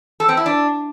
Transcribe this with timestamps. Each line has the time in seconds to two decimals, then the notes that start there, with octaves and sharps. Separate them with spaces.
0.20 A4
0.29 C4
0.37 E4
0.46 D4